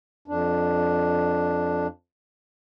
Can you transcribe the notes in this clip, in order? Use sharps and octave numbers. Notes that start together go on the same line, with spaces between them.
F2 D4